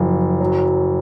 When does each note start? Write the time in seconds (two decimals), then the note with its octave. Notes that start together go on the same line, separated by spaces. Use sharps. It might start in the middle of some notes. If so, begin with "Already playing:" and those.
Already playing: F#1 F3
0.41 F#3